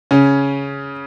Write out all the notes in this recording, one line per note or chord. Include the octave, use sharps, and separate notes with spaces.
C#3 C#4